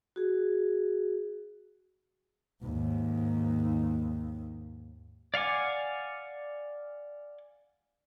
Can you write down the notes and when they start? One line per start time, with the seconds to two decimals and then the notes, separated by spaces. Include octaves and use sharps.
0.16 F#4 G#4
2.63 D#2 G#2
5.34 D5 F5 F#5 G#5 D6